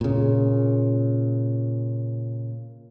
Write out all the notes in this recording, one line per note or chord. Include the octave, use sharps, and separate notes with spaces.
A#2 C#3